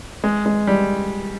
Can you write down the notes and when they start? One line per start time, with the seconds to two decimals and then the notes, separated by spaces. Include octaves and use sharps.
0.24 G#3
0.46 G#3
0.67 G3